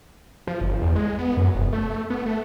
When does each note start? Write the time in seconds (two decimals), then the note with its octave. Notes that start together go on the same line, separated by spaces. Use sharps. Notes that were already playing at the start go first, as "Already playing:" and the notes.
0.47 F3
0.61 G1
0.82 E2
0.95 G#3
1.19 B3
1.37 F#2
1.55 F1
1.73 A3
2.10 B3
2.26 A3